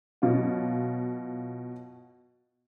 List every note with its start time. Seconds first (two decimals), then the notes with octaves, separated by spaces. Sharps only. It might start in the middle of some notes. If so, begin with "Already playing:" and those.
0.22 B2 F#3 F4